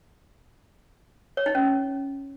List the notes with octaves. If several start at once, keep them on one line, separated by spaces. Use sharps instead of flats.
C#5
D#4
C#4